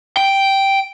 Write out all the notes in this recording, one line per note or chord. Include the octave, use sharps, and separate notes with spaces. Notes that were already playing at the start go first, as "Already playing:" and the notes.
G5